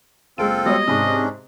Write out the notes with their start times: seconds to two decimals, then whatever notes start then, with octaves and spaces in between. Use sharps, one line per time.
0.38 F#1 G#3 C4 F4 G#4 A4 D7
0.66 G3 G#3 B3 F#4 C#5 D#5
0.88 G#2 C3 C#4 D4 D#6